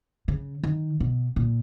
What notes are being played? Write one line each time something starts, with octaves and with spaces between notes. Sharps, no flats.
C#3
D#3
B2
A#2